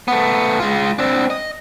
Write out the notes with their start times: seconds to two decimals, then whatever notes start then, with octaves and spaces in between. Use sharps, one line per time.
0.08 A3 B3
0.59 G#3 F4
0.99 C4 D4
1.30 D#5